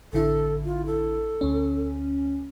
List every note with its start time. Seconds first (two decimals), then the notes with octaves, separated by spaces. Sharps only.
0.13 A1 D3 E4 A4
0.65 F4
0.86 A4
1.41 D2 C#4